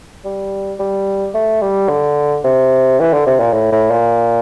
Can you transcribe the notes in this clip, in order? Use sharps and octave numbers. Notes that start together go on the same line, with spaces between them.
G3
G3
A3
G3
D3
C3
E3
D3
C3
A#2
A2
A2
A#2